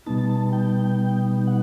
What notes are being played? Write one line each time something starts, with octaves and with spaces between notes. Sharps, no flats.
B2 G3 B3 D#4 A5
A5
A5
A5
G5
F#5